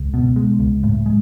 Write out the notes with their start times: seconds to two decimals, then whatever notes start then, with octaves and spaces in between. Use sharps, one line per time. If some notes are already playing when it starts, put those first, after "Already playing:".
Already playing: C#2
0.14 B2
0.36 G#3
0.59 C#2
0.84 A2
1.06 G#3